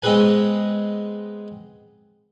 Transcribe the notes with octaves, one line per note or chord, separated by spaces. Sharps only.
G#3 B3 C4 G#4 B4 G#5